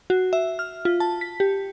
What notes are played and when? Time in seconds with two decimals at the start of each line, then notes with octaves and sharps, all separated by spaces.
0.10 F#4
0.33 E5
0.59 F6
0.85 F4
1.00 A5
1.21 B6
1.40 G4